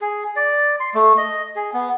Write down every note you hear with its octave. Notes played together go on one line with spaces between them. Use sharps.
G#4
D5
C6
A3
D#5
G#4
B3